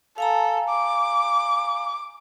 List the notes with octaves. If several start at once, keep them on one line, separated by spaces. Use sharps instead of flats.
A4 F5 G#5 A#5
D6